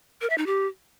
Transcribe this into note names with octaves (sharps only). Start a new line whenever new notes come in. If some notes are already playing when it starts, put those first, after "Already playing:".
A#4
E5
D#4
G4